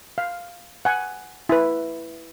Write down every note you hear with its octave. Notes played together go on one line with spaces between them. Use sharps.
F5
F#5 G#5
E4 B4